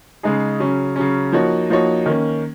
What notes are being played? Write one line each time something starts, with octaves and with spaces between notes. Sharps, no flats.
C#3 G#3 D#4 G#4
C#3 F#3 C#4
C#3 F#3 C#4
F3 A#3 D#4 F#4 C#5
F3 A#3 D#4 F#4 C#5
D#3 A#3 C#4